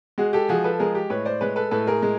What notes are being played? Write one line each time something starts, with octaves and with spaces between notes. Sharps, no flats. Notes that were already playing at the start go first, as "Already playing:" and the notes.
G#3 F#4 G#4
G4 A4
F3 F#4 G#4
A4 B4
G#3 G#4 A#4
G4
A2 B4 C#5
C5 D5
G#3 B4 C#5
A4 B4
A2 A4 B4
G#4 A#4
G#3